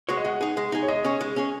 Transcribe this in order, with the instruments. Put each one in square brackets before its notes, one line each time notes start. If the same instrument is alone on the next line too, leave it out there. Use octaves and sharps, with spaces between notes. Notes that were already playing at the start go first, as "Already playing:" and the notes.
[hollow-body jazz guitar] G#3 F#4 C#5
[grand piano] D#5
[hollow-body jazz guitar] G#3 [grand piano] F#5
[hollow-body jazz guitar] D#4 G#4
G#3
D#4 G#4
[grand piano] C#5
[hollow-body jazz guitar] G#3 [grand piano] D#5
[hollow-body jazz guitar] C#4 G#4 C#5
G#3
C#4 G#4 C#5